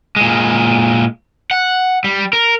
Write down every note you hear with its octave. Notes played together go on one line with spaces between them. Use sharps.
A#2 G#3
F#5
G3
A#4